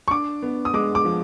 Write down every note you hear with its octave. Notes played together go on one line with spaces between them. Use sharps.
C#6
D4 D6
B3
D#6
G#3 D6
D6
F3